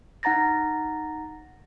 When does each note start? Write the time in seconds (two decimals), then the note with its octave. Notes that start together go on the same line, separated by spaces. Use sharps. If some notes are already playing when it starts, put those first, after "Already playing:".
0.23 D#4 F#5 A#5 A6 A#6